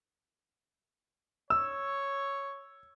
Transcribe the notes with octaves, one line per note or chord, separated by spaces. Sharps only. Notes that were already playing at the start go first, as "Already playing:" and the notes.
C#5 E6